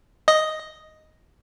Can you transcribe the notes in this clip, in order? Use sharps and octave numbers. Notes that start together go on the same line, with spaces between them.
D#5